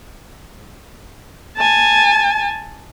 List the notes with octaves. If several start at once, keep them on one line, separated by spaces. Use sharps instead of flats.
G#5 A5